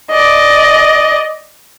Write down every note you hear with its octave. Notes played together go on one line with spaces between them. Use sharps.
D5 D#5